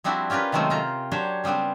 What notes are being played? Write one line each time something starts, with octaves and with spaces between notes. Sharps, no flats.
F3 G3 C4 D4 E4 F#4
C#4 F4 G4 A#4 B4
C3 D#3 F#3 G#3 A3 C4
C3 F4 A#4 A#5
F#3 D4 G4 C5 C#5
C#3 G3 B3 C4 D4